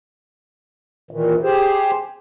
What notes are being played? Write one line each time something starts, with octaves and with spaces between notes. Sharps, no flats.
D#2 A#2 D#3 E3
G4 G#4 C5